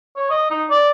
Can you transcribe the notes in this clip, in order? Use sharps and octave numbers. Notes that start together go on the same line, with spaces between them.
C#5
D#5
D#4
D5